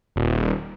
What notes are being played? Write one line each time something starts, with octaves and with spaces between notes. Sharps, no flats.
D#1